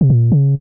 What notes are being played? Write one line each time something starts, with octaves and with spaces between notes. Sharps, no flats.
C3
A#2
C#3